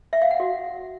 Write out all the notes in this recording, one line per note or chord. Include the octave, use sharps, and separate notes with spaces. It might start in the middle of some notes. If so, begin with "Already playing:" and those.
E5
F5
F#5
F#4